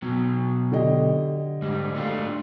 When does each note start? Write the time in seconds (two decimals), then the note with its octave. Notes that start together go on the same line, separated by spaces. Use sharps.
0.02 B2 F#3
0.72 D3 G4 D#5
1.62 G#2 G3
1.95 A3 D4 F4